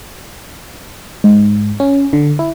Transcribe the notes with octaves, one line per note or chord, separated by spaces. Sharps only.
G#2
C#4
D3
E4